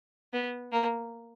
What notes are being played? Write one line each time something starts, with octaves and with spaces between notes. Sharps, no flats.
B3
A#3